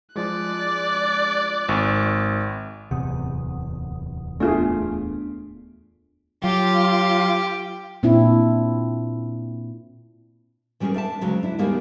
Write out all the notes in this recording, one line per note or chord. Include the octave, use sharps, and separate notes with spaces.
F3 G#3 D5 F#6
G#1 C#6
D1 E2 C3 F#5 D#6
A3 B3 D4 F4 G#4
F#3 F4 G4
A#2 C4 D4 E4
E3 G3 C#4 F#4 G#4 A#4
D4 E5 F5 A5
D2 C#3 F#3 G#3
D4 E4
D#2 G3 G#3 A#3 B3 D#4